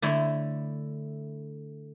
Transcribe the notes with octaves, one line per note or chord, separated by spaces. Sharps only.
D3 A3 E4 C#5